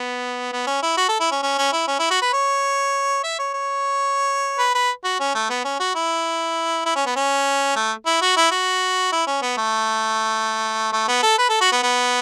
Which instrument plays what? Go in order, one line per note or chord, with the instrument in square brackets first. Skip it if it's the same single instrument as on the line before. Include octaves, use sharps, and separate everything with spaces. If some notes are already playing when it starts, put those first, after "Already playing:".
Already playing: [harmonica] B3
B3
C#4
E4
F#4
A4
E4
C#4
C#4
C#4
E4
C#4
E4
F#4
B4
C#5
E5
C#5
C#5
B4
B4
F#4
C#4
A3
B3
C#4
F#4
E4
E4
C#4
B3
C#4
A3
E4
F#4
E4
F#4
E4
C#4
B3
A3
A3
B3
A4
B4
A4
F#4
B3
B3